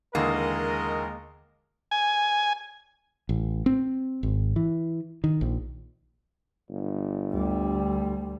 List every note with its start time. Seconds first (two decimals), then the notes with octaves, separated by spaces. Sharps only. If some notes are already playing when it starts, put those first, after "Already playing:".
0.15 D#2 D3 E3 G#3 A#3 A#4 D#5
1.91 G#5
3.29 A1
3.66 C4
4.23 G#1
4.56 E3
5.24 D#3
5.41 A#1
6.69 G1
7.32 D2 G3